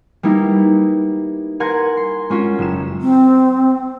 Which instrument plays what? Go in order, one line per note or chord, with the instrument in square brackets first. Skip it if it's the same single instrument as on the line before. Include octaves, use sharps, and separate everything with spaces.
[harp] G3 A#3 B3 D#4 E4
A#4 F#5 G#5 C6 F#6 G#6
C6
G#3 C#4 F4 F#4
F#1 E7
[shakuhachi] C4